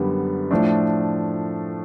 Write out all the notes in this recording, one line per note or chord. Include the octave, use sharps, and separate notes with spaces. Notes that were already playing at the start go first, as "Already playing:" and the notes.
Already playing: F#2 D3 G3 B3
A2 F3 A3 D4